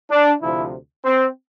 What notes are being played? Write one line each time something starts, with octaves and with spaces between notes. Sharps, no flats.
D4
D2 C3 F3 E4
C4